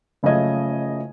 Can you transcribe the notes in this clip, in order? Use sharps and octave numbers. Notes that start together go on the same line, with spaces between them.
F#1 C#3 F3 A3 D#5 G#6